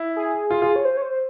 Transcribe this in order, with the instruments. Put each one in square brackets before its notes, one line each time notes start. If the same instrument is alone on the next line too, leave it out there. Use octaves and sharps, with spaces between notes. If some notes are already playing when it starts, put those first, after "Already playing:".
Already playing: [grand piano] E4
[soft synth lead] G#4
[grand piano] F4
F4
[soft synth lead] C#5
C5
C#5
C5